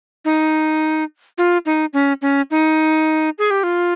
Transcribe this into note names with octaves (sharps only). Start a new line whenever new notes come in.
D#4
F4
D#4
C#4
C#4
D#4
G#4
G4
F4